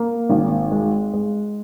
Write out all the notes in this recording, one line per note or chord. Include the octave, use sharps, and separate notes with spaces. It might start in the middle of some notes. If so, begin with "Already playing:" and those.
Already playing: A#3
G#1
G#3
G#3